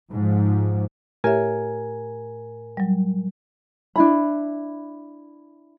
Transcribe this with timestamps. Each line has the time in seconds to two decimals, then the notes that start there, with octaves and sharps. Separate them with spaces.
0.12 G#2 F3
1.24 A2 G4 A#4 C#5 E5 G#5
2.77 F#3 G3
3.96 D4 E4 B5